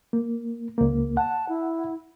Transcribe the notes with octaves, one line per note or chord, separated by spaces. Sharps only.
A#3
C#2 A#3
F#5 A5
E4